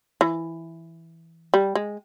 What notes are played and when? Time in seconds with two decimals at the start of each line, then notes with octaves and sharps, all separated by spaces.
0.21 E3
1.54 G3
1.75 G#3